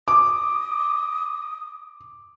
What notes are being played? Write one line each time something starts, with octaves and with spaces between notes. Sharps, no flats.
D6 D#6